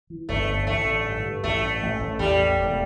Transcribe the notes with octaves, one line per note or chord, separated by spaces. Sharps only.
E3
G1 A3
G1
A1 A3
D3
G2
G2
A1 A3
G2
A1
A1
E2 G3
A3
E1